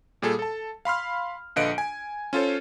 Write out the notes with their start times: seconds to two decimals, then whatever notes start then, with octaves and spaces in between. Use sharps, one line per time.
0.22 A#2 G3 G#4 A4
0.39 A4 A5
0.85 F5 B5 C6 F6
1.56 A#1 D3 B4 D#5 F5 D7
1.78 G#5
2.33 C#4 F4 A4 C5 C#5